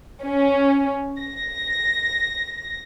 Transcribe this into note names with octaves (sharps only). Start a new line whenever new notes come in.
C#4
A#6